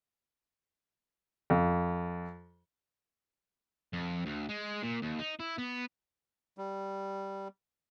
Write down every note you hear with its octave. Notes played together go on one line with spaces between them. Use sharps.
F2
F2
D2
G#3
A#2
D#2
D#4
E4
B3
G3